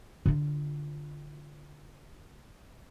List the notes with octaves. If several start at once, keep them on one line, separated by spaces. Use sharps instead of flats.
D3 F4